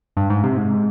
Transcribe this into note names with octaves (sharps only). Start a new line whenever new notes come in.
G2
G#2
C3
G#2